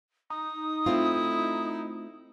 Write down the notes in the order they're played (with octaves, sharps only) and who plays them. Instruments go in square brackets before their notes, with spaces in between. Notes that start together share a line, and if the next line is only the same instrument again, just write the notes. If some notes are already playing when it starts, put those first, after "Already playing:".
[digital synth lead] D#4 [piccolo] D#6
[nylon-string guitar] A3 C4 F4 [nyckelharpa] E4